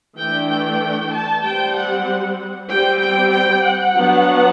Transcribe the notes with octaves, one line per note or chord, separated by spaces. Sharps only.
E3 A3 D4 G5
G5
A5
G3 C4 G5
F#5
G3 C4 G5
G5
G5
F#5
F#3 B3 D4